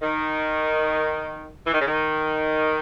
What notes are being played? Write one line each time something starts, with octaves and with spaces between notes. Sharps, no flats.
D#3
E3
D#3
C#3
D#3